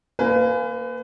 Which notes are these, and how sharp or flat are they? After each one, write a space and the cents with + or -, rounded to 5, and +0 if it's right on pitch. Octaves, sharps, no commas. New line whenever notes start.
A#3 +0 B4 +35 G#5 +0